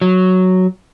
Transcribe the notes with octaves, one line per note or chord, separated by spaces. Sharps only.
F#3